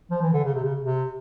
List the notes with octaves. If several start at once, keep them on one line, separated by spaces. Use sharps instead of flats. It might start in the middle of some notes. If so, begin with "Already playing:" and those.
F3
E3
D3
C#3
C3
C#3
C3